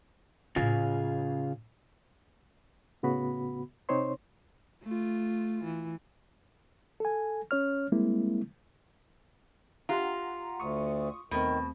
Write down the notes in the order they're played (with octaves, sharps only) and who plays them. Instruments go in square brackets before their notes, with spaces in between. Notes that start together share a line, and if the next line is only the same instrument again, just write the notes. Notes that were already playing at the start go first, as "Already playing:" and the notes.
[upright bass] A2 C#4 [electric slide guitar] C#3 F4 G#4
[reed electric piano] A2 C#3 B3 F#4 B5
C3 C4 D#4 C5 C#5 C6
[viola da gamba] A3 F4
E3
[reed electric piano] A4 G#5
C#4 C#5 F6
G3 G#3 A#3 C4 E4
[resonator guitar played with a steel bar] F4 [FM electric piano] G4 F#5 A#5
[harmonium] D2 [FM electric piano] C#6 D#6
[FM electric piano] D#2 A3 C4 [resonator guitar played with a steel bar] B2 [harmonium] D#3